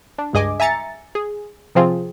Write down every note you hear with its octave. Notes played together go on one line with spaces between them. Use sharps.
D4
C#2 G2 G#4 D#5 G#5 D6
E5 G#5 A#5 A6 C#7
G#4
C3 F3 C4 F4 G#4